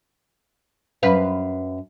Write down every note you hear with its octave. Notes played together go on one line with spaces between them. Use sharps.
F#2 B4 F5